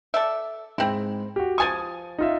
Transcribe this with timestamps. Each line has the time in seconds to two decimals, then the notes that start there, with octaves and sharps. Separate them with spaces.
0.14 A4 D5 E5
0.78 G#2 C4 E4
1.36 F#4 G4
1.58 F3 G#5 C#6 D#6 A6
2.18 D#4 F4 E5